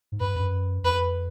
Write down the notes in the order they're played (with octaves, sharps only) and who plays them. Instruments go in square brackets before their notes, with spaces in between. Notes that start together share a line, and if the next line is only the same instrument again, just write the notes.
[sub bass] G#2
[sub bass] G2 [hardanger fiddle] B4
[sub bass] F#2
[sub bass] F2 [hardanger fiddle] B4